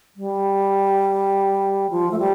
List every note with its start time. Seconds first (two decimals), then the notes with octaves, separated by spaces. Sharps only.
0.16 G3
1.90 F3
2.11 A3
2.19 G3